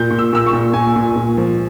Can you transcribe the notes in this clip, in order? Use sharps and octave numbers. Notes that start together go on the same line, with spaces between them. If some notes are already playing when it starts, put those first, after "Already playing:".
Already playing: A#2 G6
A#2
E6
A#2 E6
C#6
A#2
A#2 G#5
A#2
A#2
F3